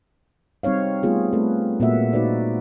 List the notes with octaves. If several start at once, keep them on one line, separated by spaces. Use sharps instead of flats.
G3 C4 D#4 C#5 F5
G3 A3 B3 F4 G#4
A3 C4 A4 B4
A#2 A#3 B3 F#4 E5 F#5
D#4 F#4 B4 C5 D5